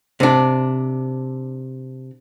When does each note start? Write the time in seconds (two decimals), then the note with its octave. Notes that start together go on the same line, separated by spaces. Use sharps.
0.20 C3 D4